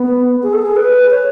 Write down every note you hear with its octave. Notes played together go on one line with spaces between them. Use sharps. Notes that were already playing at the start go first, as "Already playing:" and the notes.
Already playing: B3
G#4
A4
G#4
B4
C#5